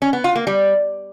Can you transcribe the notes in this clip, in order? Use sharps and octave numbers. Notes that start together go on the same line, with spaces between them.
C#4
B3
F4
A#3
G3